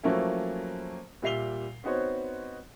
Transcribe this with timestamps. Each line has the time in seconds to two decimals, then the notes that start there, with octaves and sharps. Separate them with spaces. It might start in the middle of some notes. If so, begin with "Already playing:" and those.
0.03 F3 F#3 A3 A#3 C#4 E4
1.22 A#2 G3 E5 C7 F7 G7
1.84 B3 C4 D#4 F#4 C5 C#5